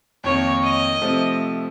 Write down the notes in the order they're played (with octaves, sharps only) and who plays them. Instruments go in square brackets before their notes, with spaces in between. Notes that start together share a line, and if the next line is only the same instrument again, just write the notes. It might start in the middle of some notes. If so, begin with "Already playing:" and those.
[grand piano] F2 D#3 A#3 [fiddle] C#5
[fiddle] D#5
[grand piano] C3 F3 A3 C4